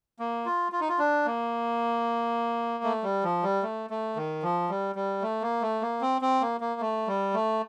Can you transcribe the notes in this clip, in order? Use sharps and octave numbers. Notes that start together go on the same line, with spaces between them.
A#3
F4
F4
D#4
F4
D4
A#3
A3
G3
F3
G3
A3
A3
D#3
F3
G3
G3
A3
A#3
A3
A#3
C4
C4
A#3
A#3
A3
G3
A3